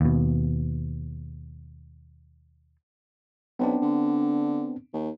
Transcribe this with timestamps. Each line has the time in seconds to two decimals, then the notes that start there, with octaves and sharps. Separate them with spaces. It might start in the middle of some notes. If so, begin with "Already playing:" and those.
0.01 D#2 B2
3.59 B1 B3 C4 D4
3.82 D3
4.94 D#2